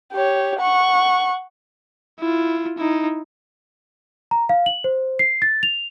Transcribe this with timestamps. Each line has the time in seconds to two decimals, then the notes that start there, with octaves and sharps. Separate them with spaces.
0.13 G4 C#5
0.59 F#5 C#6
2.19 E4 F4
2.78 D#4 E4
4.31 A#5
4.49 F5
4.66 F#7
4.84 C5
5.19 C7
5.42 A6
5.63 F7